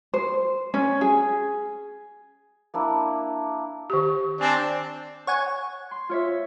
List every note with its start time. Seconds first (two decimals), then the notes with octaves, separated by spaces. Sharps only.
0.14 C5
0.74 C#4
1.01 G#4
2.74 A#3 D4 E4
3.90 D#3 G4
4.41 C4 D4 G#5 A5
5.27 C#5 F#5 G#5
5.91 C6
6.09 F4 C#5 E5